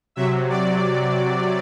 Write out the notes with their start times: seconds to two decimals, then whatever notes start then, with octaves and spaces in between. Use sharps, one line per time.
0.16 C3 F#3 E5
0.49 D5